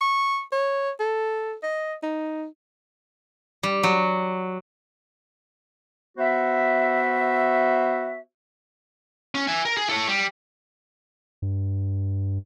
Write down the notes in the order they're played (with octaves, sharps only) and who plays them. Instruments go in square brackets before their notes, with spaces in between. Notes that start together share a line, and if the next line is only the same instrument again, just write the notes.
[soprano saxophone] C#6
C#5
A4
D#5
D#4
[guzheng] G3
F#3
[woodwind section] B3 F#4 C5 E5
[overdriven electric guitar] C#4
E5 G#5
A#4
G#4
A4 C#5
G3
[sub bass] G2